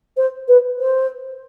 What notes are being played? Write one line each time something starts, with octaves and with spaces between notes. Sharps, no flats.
C5
B4
C5